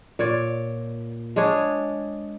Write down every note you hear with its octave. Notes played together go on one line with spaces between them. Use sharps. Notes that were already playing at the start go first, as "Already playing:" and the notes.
A#2 C#5 D5
G#3 D4 G#4 C#5